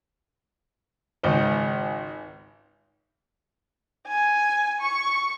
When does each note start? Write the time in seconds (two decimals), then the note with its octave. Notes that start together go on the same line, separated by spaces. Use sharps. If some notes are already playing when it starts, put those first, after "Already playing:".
1.23 G#1 C#2 C5
4.07 G#5
4.81 C#6